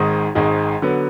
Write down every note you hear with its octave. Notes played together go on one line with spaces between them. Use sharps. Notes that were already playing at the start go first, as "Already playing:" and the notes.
Already playing: G#1 G#2 D#3 G#3 D#4
G#1 G#2 D#3 G#3 D#4
D3 F#3 B3